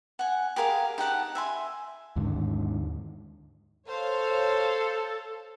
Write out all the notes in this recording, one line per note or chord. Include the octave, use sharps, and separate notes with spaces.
F#5 G#5
G4 G#4 A#4 F5
D#4 G4 F#5 A5
E5 G#5 C6
D#2 G#2 D3 D#3
A4 C5 C#5 F5